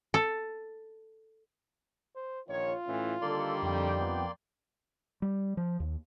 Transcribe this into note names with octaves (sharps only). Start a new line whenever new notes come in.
A4
C5
A#1 D#3 F4 C#5
A2 E3 C#4
D3 D#3 G3 A#3 A4 D5 C6
F2 G5
B3
G3
F3
D#2